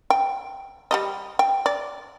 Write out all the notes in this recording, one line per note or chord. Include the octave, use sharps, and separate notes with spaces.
G5
G3 G4 D#5
G5
D5